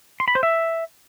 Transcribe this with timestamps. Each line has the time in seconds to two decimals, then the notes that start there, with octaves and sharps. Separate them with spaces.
0.20 C6
0.28 B5
0.35 C5
0.43 E5